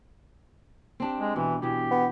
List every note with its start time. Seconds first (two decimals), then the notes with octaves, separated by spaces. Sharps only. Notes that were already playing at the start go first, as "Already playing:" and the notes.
1.00 C4 D4 G4
1.19 G#3
1.36 B2 E3
1.62 B2 E3 G4
1.91 B3